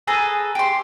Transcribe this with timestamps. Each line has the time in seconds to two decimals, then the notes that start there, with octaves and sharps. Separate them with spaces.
0.07 G#4 A4 B4 A#5
0.55 G4 C6